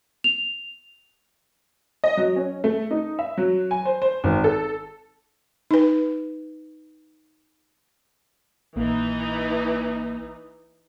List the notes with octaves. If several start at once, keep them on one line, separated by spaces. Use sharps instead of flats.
F7
D#5
F#3
C#4
A3
D#4
E5
F#3
G#5
C5
C5
G#1
A4
D#4 B4
A#1 E3 A#3 D#4